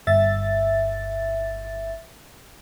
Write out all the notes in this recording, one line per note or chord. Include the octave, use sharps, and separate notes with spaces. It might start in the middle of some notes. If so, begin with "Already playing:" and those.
G1 E5 A6